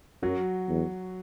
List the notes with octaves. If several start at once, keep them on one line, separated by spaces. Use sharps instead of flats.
F#2 F#3 F#4
E2